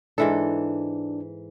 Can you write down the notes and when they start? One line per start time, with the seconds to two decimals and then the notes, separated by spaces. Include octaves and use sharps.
0.18 G#2 E3 D4 A4